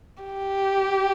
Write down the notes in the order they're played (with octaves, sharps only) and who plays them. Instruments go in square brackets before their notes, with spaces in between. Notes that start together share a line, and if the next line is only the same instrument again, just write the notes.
[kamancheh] G4